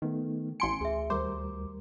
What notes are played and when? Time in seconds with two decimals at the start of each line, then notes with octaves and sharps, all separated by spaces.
0.02 D#3 A3 B3 D#4
0.60 A1 G#5 C6 C#7 D7
0.81 D2 G#4 E5
1.10 D#2 G3 A#4 C5 D6